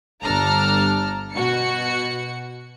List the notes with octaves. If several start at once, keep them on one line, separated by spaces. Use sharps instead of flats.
G1 D4 A4 A5 A#5 F6
B2 F#4 C#7